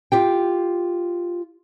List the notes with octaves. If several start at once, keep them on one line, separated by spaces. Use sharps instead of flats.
F4 G4 G5